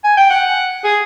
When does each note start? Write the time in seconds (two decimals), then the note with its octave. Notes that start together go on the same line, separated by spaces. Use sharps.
0.04 G#5
0.17 G5
0.30 F#5
0.84 G#4